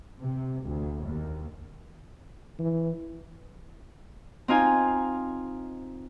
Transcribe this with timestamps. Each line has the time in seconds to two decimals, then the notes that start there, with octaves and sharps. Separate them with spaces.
0.21 C3
0.65 D2
1.04 D#2
2.59 E3
4.48 C4 D#4 F4 G#5